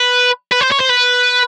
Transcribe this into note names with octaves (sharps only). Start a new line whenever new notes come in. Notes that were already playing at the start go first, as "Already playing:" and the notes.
Already playing: B4
B4
C5
C#5
C5
B4